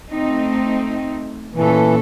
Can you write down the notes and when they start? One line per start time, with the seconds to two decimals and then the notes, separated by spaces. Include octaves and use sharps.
0.11 A3 C4 D#4
1.54 A#2 E3 C#4 A4